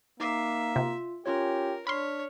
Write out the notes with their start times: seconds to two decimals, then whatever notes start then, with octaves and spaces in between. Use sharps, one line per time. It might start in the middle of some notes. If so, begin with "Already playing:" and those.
0.20 A#3 D#4 E5 D6 C7
0.76 C3 F4
1.26 C#4 F4 G4 A#4 C#5
1.87 D4 C#5 B5 C6 F6 B6